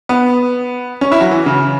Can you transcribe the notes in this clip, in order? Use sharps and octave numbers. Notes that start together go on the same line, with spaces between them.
B3
C#4
E4
F#3
E3
C#3